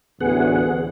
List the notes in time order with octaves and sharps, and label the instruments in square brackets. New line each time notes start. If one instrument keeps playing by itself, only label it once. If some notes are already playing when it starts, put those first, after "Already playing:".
[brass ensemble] A1 D2 [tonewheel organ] B3 G#4 F#5